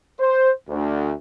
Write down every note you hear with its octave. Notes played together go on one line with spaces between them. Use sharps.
C5
D2